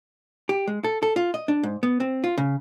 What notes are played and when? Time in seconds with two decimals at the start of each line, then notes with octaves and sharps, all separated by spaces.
0.49 G4
0.67 G#3
0.84 A4
1.03 A4
1.16 F4
1.34 D#5
1.48 D4
1.63 G#2
1.83 B3
2.00 C4
2.24 F4
2.38 C#3